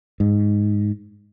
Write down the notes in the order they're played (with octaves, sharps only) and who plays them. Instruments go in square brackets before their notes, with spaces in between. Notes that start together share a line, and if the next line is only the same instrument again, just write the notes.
[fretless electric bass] G#2